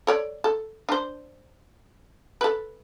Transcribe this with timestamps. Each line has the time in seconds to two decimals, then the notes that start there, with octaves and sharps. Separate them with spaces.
0.07 A4 C#5 D5
0.44 A4
0.89 D4 C5
2.41 A4 B4